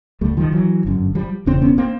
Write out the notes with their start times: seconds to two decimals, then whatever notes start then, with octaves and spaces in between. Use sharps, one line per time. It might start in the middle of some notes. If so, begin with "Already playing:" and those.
0.21 D2 D3 G3 A3
0.37 D#3 F3
0.52 E3 F#3
0.85 G1 F#2 D3
1.15 F3 G3
1.46 E1 E2 C#3 C4 D4
1.62 B3 C#4
1.78 A#3 C4